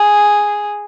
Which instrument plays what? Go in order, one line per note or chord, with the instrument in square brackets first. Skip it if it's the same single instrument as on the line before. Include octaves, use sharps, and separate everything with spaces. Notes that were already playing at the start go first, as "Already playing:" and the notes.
Already playing: [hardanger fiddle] G#4